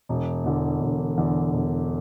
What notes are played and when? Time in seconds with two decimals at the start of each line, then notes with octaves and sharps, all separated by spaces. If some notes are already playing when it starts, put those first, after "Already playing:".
0.09 E1
0.44 E2 D3
0.81 E1
1.18 E2 D3
1.53 E1